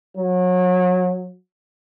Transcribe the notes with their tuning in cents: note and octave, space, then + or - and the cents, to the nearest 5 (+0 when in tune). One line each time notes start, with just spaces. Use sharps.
F#3 -30